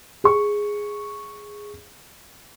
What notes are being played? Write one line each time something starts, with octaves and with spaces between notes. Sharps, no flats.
G#4 C#6